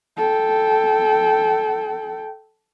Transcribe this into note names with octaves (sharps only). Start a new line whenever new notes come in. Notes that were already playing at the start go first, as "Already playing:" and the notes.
A4 G5